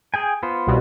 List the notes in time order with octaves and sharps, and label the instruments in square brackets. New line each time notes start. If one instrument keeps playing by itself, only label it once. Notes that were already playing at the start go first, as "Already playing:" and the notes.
[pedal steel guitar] G#4 G5 G#5
B3 F4 C5
[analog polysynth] C2 B2